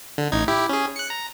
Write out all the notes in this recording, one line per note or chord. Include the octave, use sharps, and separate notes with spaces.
D3
A1 D#4 G#6
E4 G4
C#4 G#4
F#6 C#7
A#5